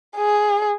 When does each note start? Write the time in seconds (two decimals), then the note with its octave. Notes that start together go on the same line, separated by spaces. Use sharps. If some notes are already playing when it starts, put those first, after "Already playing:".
0.17 G#4